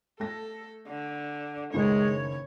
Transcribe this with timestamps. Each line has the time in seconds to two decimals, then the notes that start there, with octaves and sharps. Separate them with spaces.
0.20 A3 A4 A#6
0.88 D3
1.73 F#1 A2 D#3 G#3 C#5